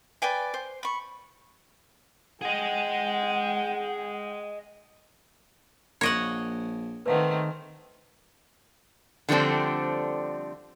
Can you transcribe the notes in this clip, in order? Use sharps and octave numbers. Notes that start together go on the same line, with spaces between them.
B4 D5 G5 G#5
C5
B5 C#6
G#4 D#5 F#5 G5
A#1 F4 C#5 D#5 F5 F#5
D#3 A3 C4 B4 F5 F#5
D3 F3 G3 A3 C4 D4